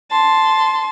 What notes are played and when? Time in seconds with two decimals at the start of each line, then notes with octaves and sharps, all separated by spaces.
0.11 A5 C6